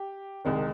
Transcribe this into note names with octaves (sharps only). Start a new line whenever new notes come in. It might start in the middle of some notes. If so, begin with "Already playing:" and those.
Already playing: G4
C2 C3 D#3 G#3